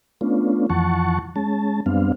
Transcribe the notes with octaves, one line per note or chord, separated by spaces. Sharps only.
A3 B3 C#4 D4 F4
F2 E3 F3 F#5 A5 C#6
G#3 C#4 A5
F#2 G3 B3 C4 D4 F5